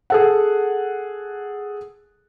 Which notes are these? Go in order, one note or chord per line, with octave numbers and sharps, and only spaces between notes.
G#4 A4 F#5